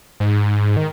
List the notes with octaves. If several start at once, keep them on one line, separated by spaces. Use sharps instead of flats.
G#2
D#3